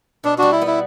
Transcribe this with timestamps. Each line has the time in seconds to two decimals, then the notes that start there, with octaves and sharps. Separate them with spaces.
0.24 B2 D4
0.38 G3 D4 F#4
0.52 E4
0.61 B3
0.67 E4